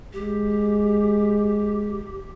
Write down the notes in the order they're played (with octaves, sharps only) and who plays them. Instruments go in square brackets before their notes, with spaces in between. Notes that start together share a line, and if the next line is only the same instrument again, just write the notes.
[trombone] G#3 [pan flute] G4